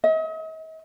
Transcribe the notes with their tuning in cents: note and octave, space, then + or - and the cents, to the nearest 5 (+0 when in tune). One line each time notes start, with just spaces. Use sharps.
D#5 +45